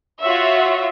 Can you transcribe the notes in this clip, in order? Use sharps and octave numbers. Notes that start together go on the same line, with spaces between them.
F4 F#4 C#5 E5